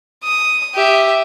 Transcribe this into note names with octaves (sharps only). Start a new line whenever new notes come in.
D#6
G4 E5